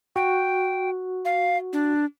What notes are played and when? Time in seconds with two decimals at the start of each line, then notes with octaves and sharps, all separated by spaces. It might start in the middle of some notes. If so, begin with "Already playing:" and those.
0.16 F#4 G5
1.25 F5
1.73 D4